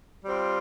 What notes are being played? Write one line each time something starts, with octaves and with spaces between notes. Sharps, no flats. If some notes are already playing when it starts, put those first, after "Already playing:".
G3 C4 F4